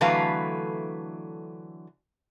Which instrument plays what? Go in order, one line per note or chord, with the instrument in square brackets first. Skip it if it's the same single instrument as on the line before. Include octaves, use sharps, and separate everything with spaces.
[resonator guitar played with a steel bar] D3 E3 F#3 A3 B4 F5